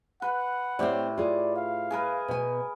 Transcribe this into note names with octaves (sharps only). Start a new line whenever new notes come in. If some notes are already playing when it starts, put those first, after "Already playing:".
B4 F#5
A2 C4 G4 C#5 D5
F4 G#4 D5
F5
G#4 A#4 B4
B2 G#5